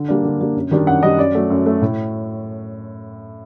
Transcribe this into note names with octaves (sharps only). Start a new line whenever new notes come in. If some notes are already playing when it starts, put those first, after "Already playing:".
Already playing: D3
G3 A#3 D4
D3
G3 A#3 D4
F#2
D#3 G3 D4
F#2 F#5
D#3 G3 D4 D#5
F#2 D5
F#3 A3
F#2
F#3 A3
A2